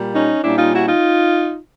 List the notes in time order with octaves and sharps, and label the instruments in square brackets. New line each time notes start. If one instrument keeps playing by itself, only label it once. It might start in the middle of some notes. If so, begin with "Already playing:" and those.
Already playing: [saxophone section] A#2 G3 A#3
C#4 D#4
A#2 G3 A#3 C#4 D4 E4
D#4 F4
E4 F#4
D#4 F4